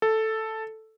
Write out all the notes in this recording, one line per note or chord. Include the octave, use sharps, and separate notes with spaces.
A4